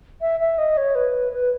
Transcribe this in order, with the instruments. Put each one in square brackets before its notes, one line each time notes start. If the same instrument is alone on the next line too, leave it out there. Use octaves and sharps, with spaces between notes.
[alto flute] E5
E5
D#5
C#5
B4
B4